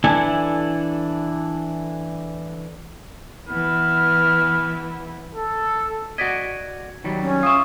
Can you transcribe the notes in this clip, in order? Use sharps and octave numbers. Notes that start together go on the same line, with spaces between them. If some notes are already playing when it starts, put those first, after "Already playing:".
E3 D4 E4 A4 G#5
E3 B3 E4 F6
A4
F#4 D5 D#5 G#6 B6
D#3 F#3 G3
C#4
F4 E5 C#6 D#6